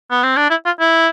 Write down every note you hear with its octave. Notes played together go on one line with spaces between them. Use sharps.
B3
C4
D4
E4
F4
E4